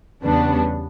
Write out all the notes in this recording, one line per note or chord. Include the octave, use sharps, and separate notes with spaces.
E2 C#3 G3 B3 D4